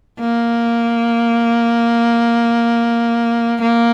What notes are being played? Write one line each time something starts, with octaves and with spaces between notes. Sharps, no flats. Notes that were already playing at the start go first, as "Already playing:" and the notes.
A#3
A#3